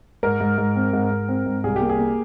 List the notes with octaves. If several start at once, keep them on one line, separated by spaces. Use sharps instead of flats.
G#2 A#4
G#2
G#2
C4
G#2
G#2
C4
G#2
C2 G#4
G4
A#3
G#4
A#3